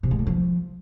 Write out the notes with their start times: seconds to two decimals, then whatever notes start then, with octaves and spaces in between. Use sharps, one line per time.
0.03 C3
0.11 G#3
0.19 D3
0.27 F3